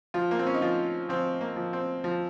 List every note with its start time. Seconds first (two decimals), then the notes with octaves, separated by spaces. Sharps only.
0.14 F3 F4
0.31 A#3
0.39 C4
0.47 C#4
0.54 D#4
0.62 F3 F4
1.09 F3 C4
1.41 A#3
1.56 F3
1.73 C4
2.04 F3